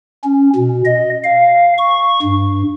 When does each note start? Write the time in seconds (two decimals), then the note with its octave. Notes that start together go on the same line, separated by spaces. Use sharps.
0.24 C#4
0.55 B2
0.85 D#5
1.24 F5
1.78 C#6
2.23 G2